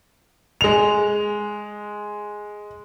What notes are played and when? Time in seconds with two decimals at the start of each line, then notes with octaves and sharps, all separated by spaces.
0.61 G#3 F7